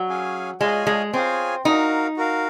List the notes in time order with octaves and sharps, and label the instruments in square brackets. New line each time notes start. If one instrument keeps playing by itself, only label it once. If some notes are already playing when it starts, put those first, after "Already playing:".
Already playing: [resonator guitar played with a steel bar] F#3
[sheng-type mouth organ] C#4 G#4 C#5 F5 G#5
[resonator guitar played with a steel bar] G#3 [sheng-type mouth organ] F4 G#4 C#5 G#5
[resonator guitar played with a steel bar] G#3
[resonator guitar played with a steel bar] C4 [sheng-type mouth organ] F4 G#4 C#5 G#5
[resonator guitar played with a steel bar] D#4 [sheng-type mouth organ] F#4 A#4 F5
[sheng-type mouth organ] F#4 A#4 F5